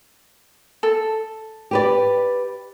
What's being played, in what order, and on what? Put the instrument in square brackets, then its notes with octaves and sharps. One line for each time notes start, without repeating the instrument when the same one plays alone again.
[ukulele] A4
[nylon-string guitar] G4 B4 D5